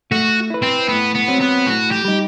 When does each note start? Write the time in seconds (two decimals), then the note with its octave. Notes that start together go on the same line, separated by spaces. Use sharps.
0.11 A3 F#4
0.50 E4 B4
0.63 C4
0.88 A2 B3
1.15 B3
1.28 F#3 C4
1.40 B3
1.66 A2 F#4
1.91 G4
2.05 G3 D#4